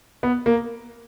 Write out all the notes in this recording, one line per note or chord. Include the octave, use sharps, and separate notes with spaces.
B3
A#3